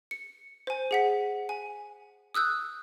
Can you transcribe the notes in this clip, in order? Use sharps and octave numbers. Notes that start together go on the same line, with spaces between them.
C#7
C5 G#5
G#4 F#5 B6
G#5
D#6 E6 F#6 G6